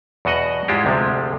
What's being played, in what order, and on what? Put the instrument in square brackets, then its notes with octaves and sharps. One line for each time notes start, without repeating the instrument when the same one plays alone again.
[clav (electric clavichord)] E2 B2 F#4 D#5 F#5
G#2 G#3 E4 F4 G4
D2 C3 F3 G#3